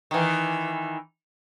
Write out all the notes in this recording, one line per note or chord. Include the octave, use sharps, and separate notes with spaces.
D#3 E3